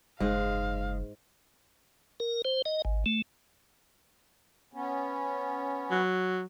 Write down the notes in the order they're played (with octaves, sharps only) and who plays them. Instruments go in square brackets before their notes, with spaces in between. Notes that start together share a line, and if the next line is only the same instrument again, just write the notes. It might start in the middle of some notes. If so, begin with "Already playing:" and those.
[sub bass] F#1 [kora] G#2 [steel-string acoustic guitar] G#3 [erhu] F5
[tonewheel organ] A#4
C5
D#5
G#1
A3
[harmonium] B3 C#4
[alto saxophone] F#3